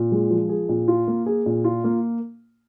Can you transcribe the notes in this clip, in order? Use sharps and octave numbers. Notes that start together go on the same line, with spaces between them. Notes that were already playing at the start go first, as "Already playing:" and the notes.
Already playing: A#2
G#3
F3
G#4
A#2
F4
A#3
G#4
A#2
F4
A#3